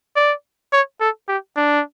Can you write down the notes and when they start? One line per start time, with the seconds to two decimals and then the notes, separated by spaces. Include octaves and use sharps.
0.16 D5
0.73 C#5
1.01 A4
1.28 G4
1.56 D4